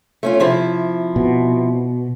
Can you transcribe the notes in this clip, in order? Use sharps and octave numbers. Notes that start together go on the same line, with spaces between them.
A3 C#4 F4
C3 F3 E4
B2